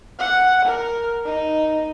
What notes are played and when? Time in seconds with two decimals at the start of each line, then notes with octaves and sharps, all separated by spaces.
0.19 F#5
0.66 A#4
1.25 D#4